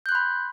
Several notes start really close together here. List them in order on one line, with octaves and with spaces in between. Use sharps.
G6 F#6 C6 B5